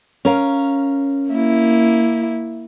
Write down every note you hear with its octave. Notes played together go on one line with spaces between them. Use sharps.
C#4 A#4 F5
A#3 E4